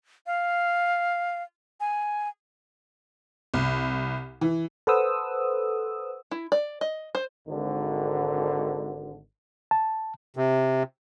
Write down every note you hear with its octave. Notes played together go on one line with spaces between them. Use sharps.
F5
G#5
C2
E3
A4 B4 C5 F#5 D#6 E6
E4
D5
D#5
C5
G#1 D3
A5
C3